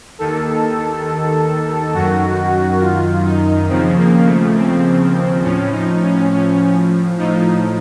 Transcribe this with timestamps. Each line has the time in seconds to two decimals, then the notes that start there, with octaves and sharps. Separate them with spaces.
0.19 D#2 D#3 A4
1.94 F#2 D#3 F#4
2.81 F4
3.25 D#4
3.69 D#2 C#3 F3 C4
3.97 A#3
4.26 A3
4.56 C4
5.43 A2 F3 C#4
5.72 D#4
6.01 C#4
6.31 C#4
7.18 A2 F3 D#4